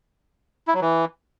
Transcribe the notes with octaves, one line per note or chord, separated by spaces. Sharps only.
E4
F#3
E3